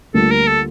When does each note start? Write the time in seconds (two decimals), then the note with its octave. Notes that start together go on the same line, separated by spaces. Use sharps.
0.14 D2 D3 G3 A#3 F4 A4
0.31 A#4
0.47 A4